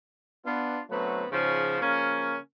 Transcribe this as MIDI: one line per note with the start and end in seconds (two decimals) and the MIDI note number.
0.46 0.80 59
0.46 0.80 62
0.46 0.80 65
0.91 1.25 50
0.91 1.25 54
0.91 1.25 57
0.91 1.25 59
0.91 1.25 60
0.91 1.25 71
1.31 1.76 44
1.31 1.76 49
1.31 1.76 53
1.80 2.36 49
1.80 2.36 53
1.80 2.36 58
1.80 2.36 61